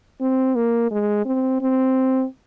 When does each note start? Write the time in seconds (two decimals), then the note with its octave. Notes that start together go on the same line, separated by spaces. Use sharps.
0.21 C4
0.56 A#3
0.91 G#3
1.26 C4
1.61 C4